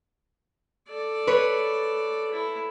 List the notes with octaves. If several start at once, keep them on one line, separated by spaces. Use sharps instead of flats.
A4 D5
B4 C#5
E4 A4